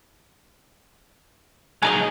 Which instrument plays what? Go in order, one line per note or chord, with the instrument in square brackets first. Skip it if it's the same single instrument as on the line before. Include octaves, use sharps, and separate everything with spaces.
[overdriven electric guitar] F#3 D#4 [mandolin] G#4 A#4 D#5